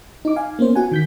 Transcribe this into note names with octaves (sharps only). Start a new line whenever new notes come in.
D#4 D6
F5 G#5
A#3 B3 C#4 C5
F#4 F#5 G#5
D#3 G6 B6